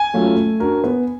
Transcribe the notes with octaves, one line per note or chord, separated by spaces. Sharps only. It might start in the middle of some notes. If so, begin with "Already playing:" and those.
Already playing: G#5
F#3 A3 C#4 F4
A3
D4 F#4 A#4
B3